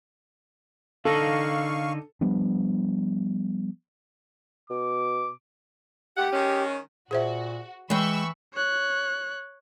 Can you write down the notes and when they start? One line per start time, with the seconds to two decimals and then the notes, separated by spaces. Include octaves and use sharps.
1.05 D3 D#4 A4 F5 C#6
2.21 F3 G3 B3 D4
4.70 B2 D6
6.17 D#2 A3 G4 F#5
6.33 D#3 G#3 C#4
7.11 A#2 F#4 G#4 C5 E5
7.90 E3 G#3 G5 B5 C#6 E6
8.54 C#5 F#6